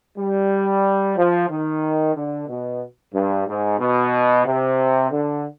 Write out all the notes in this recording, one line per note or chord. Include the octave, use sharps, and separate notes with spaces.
G3
F3
D#3
D3
B2
G2
G#2
B2
C3
D3